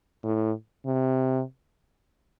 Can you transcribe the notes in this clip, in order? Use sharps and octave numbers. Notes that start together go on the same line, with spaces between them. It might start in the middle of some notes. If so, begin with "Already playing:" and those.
A2
C3